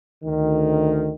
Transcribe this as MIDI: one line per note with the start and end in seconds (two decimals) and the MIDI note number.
0.24 1.14 38
0.24 1.14 51